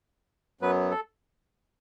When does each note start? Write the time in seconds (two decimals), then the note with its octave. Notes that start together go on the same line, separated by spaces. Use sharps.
0.61 F#2 F#3 B3 B4
0.91 A4